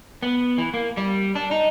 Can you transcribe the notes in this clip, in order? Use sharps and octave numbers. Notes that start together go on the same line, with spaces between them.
B3
E3
A#3
G3
D4
D#4